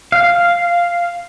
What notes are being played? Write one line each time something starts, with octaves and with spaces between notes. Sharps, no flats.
F5